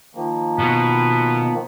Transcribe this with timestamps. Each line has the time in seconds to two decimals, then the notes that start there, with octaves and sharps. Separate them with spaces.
0.15 D#3 F3 A#3
0.59 B2 B3